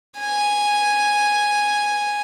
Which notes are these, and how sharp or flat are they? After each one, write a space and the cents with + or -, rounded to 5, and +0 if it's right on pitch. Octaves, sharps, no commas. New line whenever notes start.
G#5 -5